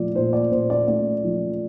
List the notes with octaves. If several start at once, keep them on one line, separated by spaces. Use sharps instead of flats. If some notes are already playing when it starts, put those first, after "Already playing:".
Already playing: A#2 F3 A3 D5
A#2 C5
D5
A#2 C5
D5
A3 D5
F3